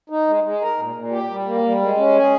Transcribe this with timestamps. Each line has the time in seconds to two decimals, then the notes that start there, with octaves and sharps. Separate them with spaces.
0.10 D#4
0.27 G#3
0.44 G#3
0.61 A#4
0.78 A#2
0.95 A#2
1.12 G4
1.29 G3
1.46 A#3
1.64 G3
1.81 G#3
1.98 C#4
2.15 G#4